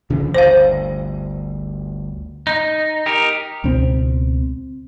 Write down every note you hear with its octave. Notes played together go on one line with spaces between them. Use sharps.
C#3 E3 F3
G1 D2 C5 F5
D#4
D#4 G4 A#4
C#2 B2 C4